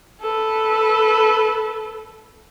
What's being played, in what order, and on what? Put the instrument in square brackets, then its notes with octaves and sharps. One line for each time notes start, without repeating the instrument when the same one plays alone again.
[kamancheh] A4 B4